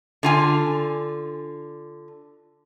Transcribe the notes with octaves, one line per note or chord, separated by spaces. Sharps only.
D3 F4 G#5